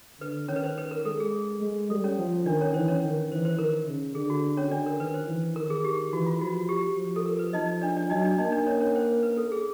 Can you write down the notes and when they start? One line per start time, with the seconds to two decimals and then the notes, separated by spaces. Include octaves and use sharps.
0.20 D3 B4
0.48 D#3 C#4 C#5
0.56 B4
0.63 C5
0.78 B4
0.91 A#4
1.05 G#3 A4
1.20 G#4
1.62 G#3
1.90 G3 A4
2.04 C#4 C#5
2.19 F3
2.46 D#3 D4 D5
2.60 C#4 C#5
2.74 E3 C5
2.88 C#4 C#5
3.03 D#3
3.32 E3 C5
3.45 C5
3.59 D#3 A#4
3.87 C#3
4.15 D3 G#4
4.30 F#4
4.57 C#4 C#5
4.71 D3 D4 D5
4.86 A#4
5.00 D#3 B4
5.14 C5
5.28 E3
5.56 D#3 A#4
5.70 G#4
5.84 G4
6.13 E3 F#4
6.26 F4
6.41 F3 F#4
6.56 F#4
6.69 G4
6.83 G4
6.97 F3
7.16 A4
7.26 A#4
7.39 B4
7.53 F3 D#4 D#5
7.82 D4 D5
7.96 D4 D5
8.10 F#3 D#4 D#5
8.24 D4 D5
8.38 A#3 D#4 D#5
8.52 D4 D5
8.67 C#4 C#5
8.80 C#4 C#5
8.95 C5
9.23 B4
9.37 A4
9.52 G#4